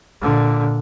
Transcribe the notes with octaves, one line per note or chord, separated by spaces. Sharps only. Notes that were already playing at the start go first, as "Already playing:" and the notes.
A#2 D3